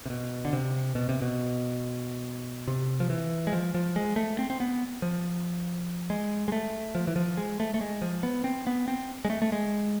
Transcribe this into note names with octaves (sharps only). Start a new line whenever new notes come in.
C3
B2
D3
C3
B2
C3
B2
C3
F3
E3
G#3
F3
F3
G#3
A3
C4
C4
B3
F3
G#3
G#3
A3
F3
E3
F3
G#3
A3
A3
G#3
F3
B3
C4
B3
C4
G#3
A3
A3
G#3